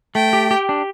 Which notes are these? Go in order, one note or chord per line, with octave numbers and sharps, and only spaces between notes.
A3 G5
G4
G4
D4